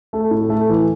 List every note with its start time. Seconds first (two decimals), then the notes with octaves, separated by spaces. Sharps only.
0.13 A3
0.31 A2
0.50 A3
0.70 E3